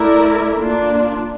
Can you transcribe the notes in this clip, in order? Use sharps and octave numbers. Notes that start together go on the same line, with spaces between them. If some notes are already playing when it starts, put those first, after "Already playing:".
Already playing: A3 E4 A#4 D5
A#3 D4 F4